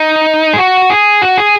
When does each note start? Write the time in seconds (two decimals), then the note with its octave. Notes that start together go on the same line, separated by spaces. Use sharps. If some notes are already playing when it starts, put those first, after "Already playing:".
Already playing: D#4
0.53 G#4
0.58 F#4
0.90 G#4
1.22 F#4
1.38 G#4